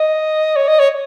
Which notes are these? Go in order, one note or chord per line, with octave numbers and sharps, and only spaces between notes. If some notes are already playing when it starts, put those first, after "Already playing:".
Already playing: D#5
C#5
D#5
C#5